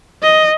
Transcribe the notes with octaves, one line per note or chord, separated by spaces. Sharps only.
D#5